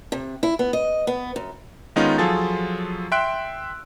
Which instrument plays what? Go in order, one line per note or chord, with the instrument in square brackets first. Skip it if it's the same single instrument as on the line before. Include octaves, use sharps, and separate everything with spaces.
[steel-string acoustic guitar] C3
E4
B3
D#5
B3
F#2
[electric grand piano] D#3 G#3 B3 C#4 D#4 F4
F3 F#3 F4 G#4 A4 A6
E5 G5 C6 E6 F#6 D7